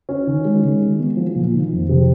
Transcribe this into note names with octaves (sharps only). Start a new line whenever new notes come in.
C#4
D#3
G#3
D#3
G#3
B3
F3
A#2
D#3
F2
C3